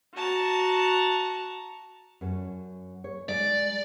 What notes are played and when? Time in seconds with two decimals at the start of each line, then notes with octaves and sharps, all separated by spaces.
0.15 F#4 A5 A#5
2.21 F#2 C#4
3.04 C#5
3.29 G#3 D#4 D5